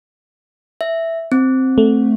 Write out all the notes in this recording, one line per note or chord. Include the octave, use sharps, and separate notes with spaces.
E5
C4
A3